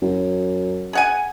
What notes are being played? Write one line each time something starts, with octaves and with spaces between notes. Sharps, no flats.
F#2
G#4 F#5 G#5